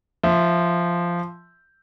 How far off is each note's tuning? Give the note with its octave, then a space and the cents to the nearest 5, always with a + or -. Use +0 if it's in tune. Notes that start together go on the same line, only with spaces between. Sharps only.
F3 -10 E5 +0